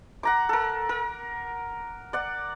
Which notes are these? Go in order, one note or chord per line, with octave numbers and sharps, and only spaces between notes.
F#5 A#5 D6
A4 A#4
A#4
D5 F#5